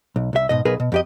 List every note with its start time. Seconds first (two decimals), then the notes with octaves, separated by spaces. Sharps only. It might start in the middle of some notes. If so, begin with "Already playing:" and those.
0.16 B1
0.33 C2 E5
0.49 G#2 B2 D#5
0.65 B1 G#4 A#4 B4
0.80 B2
0.92 F2 G4 D#5